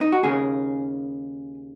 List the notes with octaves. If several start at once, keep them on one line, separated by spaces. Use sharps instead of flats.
D#4
F#4
D#2 C#3 A#3 G#4